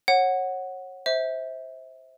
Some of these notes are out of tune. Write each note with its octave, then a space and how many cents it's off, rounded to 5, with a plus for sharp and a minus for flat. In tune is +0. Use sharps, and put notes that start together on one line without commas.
C#5 -25 F#5 +0
C5 +0 E5 -25